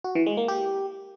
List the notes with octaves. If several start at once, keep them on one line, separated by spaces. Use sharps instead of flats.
F#4
E3
G#3
A#3
G4